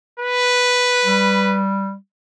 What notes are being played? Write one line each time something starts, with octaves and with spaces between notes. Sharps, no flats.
B4
G3